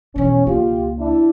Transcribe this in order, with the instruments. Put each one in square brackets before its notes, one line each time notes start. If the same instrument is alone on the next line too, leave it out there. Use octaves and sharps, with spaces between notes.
[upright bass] E2 B2 [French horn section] C#4
[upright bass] C#2 A#3 [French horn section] F4 G4
[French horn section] D4 E4